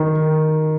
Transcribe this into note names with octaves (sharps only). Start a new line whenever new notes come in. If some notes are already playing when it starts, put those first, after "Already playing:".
Already playing: D#3